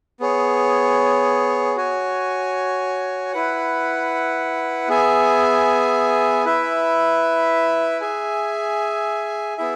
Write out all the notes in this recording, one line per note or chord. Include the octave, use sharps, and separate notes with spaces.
B3 G#4 C#5
F#4 C#5 G#5
E4 B4 F#5
B3 G#4 E5 G#5
E4 B4 E5
G#4 E5 G#5
B3 E4 G#4 E5